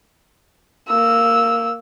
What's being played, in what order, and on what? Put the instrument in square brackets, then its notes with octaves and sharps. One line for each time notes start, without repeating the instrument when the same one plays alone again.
[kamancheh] A#3 E6